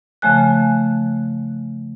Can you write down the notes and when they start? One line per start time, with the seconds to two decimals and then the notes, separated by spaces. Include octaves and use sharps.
0.22 C#3 F3 A3 G#5 F#6